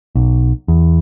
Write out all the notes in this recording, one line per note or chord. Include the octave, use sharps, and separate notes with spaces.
B1
E2